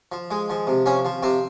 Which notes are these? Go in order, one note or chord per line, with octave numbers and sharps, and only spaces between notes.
F3
G#3
F3
C3
F3 C#4
F3
C3 C4